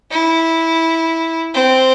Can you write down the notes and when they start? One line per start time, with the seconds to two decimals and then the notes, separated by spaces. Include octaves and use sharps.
0.11 E4
1.55 C4